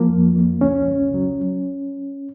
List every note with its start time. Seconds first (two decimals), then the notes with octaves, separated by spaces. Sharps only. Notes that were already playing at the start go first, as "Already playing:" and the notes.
Already playing: F3 A#3
0.09 F2
0.35 F2
0.61 C#2 C#4
0.87 C#2
1.14 F#3